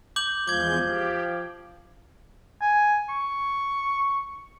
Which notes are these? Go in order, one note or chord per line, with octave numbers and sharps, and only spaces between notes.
D6 G6 F#7
E2 F3 G#3 D6 G6 G#6
G4
G#5
C#6